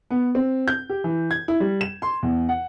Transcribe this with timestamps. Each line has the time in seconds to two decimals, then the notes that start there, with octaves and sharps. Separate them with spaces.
0.11 B3
0.35 C4
0.68 G6
0.89 G4
1.04 E3
1.31 G#6
1.48 E4
1.60 G3
1.81 E7
2.02 C6
2.23 E2
2.49 F#5